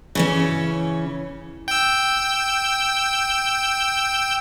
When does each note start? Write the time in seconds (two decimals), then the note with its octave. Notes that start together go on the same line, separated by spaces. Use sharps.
0.15 C#3 E3 C#4
1.68 G5 E6